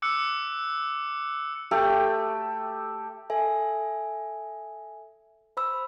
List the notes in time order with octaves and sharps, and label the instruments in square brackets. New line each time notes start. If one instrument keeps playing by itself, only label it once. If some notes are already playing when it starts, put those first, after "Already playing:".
[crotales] D6 E6 F#6 C#7
[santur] A3 G4 A4
[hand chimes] A4 E5 G#5
C5 B5 E6